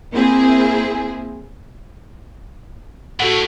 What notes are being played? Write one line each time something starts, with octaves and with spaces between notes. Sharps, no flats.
A#3 C4 E4 G#4
A2 F#4 A4 F#5